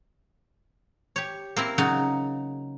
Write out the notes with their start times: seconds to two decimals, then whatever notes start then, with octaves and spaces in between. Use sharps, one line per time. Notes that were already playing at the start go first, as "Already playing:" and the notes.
1.16 G4 C#5
1.56 A#3 C4 E4
1.78 C#3 F#3 D#4 F#4